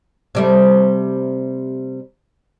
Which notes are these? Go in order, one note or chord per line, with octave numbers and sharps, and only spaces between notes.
C3 G3 A3